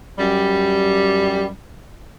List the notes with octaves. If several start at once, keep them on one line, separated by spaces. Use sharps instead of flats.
F#2 G3